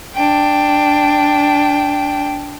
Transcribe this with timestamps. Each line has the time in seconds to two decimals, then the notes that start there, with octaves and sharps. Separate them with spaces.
0.14 D4 G5